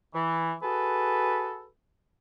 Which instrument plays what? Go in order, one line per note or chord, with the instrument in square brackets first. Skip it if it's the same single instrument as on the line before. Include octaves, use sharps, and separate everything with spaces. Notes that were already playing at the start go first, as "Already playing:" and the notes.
[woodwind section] E3
F#4 G#4 A4 B4